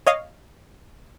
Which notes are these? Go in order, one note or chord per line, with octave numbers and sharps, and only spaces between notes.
C#5 D#5 F5